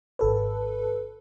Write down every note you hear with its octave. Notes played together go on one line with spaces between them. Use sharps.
G#1 A4 B4